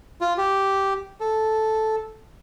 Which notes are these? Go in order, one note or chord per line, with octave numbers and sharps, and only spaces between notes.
F4
G4
A4